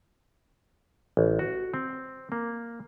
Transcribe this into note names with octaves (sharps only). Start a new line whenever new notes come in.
A1
F#4
C4
A#3